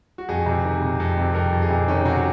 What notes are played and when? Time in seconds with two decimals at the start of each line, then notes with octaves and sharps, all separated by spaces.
0.18 F#4
0.29 F2 G#4
0.46 C3
0.65 D#3
0.82 C3
1.00 F2
1.18 C3
1.35 F2 A#4
1.52 F2
1.62 G#4
1.70 C3
1.88 D#3 C#4
2.05 C3 F#4